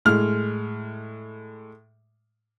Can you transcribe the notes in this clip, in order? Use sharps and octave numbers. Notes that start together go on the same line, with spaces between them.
A2 G#3 F6